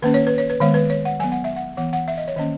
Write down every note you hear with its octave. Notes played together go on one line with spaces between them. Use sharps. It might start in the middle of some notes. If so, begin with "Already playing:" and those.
D#3 A#3 C#4 B4
C#5
B4
C#5
B4
D#3 G#3 B3 C#5
B4
C#5
F#5
F#3 B3 G#5
F#5
E5
F#5
E3 B3 F#5
F#5
E5
D#5
C#5
D#3 A#3 C#4 D#5